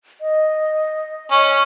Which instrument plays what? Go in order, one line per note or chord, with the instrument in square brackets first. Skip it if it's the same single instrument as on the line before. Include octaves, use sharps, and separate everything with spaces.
[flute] D#5
[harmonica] C#4